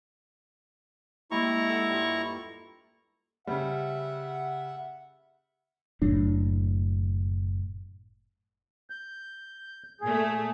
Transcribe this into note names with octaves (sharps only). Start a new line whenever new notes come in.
D#2 G#3 E4 A#5 C#6
A4 F#5
G2 F4
C#3 G3 E5 F#5
F#1 A2 F#3 D4
G6
A#2 A3 G#4